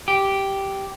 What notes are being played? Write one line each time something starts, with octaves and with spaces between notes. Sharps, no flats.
G4